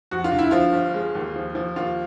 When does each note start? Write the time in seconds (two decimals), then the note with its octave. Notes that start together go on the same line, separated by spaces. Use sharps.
0.11 F2 F#4
0.24 F4
0.32 D3
0.38 E4
0.51 F3 F4
0.73 G1
0.94 G#3
1.15 D#2
1.36 F3
1.55 F3
1.76 D#2 F4